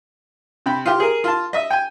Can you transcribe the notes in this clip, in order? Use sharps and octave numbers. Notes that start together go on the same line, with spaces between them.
C3 G5 B5
F4 G4
G#4 A#4
F4 A5
D#5 E5
G5 G#5